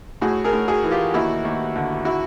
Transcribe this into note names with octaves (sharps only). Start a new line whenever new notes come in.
A2 F#4 G#4
G#4 A#4
A2
F#4 G#4
E3
F4 G4
D#2 E4 F#4
D#2
D3
E4 F#4